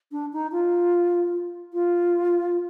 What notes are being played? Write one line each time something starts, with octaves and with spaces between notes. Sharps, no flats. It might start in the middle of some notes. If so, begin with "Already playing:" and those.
D4
D#4
F4
F4